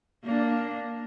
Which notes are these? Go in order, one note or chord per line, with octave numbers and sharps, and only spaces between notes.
A#3 D4